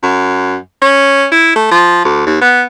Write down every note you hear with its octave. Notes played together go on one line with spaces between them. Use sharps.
F#2
C#4
E4
A3
F3
D2
D#2
B3